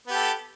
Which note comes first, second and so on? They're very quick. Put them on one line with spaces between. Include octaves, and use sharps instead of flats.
B3 G4 A4